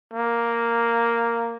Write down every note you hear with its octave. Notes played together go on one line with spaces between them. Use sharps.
A#3